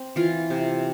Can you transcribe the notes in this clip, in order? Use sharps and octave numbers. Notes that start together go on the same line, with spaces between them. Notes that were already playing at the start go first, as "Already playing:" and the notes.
Already playing: C4
E3 F4
C3